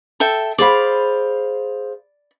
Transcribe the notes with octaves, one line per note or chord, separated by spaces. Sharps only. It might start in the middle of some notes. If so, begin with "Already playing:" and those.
A4 E5 G5
G#4 C5 D5 F5 B5